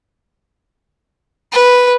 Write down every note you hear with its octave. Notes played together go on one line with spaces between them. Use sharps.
B4